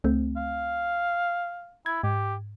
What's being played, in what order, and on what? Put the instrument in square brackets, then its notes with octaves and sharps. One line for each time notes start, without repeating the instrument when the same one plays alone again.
[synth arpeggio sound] C#2 A3 C4
[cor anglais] F5
[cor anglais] E4 [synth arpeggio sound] G#6
[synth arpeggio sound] G#2 [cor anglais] G4